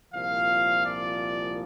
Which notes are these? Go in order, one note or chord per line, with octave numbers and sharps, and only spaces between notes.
C2 A#2 F3 F5
D5